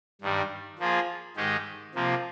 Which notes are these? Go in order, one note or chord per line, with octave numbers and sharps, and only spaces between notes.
G2 D#3 G3
F3 A#3 F4 G#4
G#2 D#3 G#3 D#4 G4
C3 F3 A#3